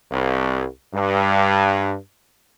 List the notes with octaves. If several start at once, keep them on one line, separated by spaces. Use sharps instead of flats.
C2
G2